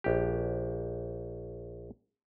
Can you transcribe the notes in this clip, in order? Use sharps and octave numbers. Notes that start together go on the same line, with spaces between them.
A#1 G4